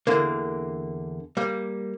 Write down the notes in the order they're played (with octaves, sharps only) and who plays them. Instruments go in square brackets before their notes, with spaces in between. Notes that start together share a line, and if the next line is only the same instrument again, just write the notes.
[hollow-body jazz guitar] E2 D3 A#3 [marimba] A#4
[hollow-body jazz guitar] G3 A#3